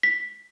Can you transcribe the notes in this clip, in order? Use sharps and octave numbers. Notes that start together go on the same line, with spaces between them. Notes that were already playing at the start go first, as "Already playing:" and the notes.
B6